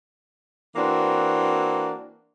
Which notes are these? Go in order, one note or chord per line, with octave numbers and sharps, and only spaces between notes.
E3 A#3 C4 D4 F#4